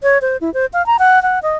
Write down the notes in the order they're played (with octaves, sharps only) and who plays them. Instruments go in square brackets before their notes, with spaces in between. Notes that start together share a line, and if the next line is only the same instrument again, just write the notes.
[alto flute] C#5
C5
E4
C5
F5
A#5
F#5
F#5
D#5